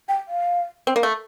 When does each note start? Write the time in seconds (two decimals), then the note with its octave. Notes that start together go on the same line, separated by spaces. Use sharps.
0.09 G5
0.28 F5
0.87 C4
0.96 A#3
1.03 A3